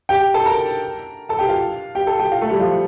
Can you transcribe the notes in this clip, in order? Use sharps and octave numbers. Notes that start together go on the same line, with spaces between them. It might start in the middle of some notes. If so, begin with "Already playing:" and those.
G4 G5
A4 A5
A#4 A#5
A4 A5
G4 G5
F4 F5
G4 G5
A4 A5
G4 G5
F4 F5
A3 A4
G3 G4
F3 F4